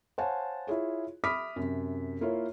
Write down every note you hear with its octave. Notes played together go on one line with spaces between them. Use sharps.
C5 C#5 F5 F#5 G#5 A5
E4 F4 G#4 C#5
E5 B5 D6 D#6 F6 B6
F#2 C3
A#3 E4 F4 C#5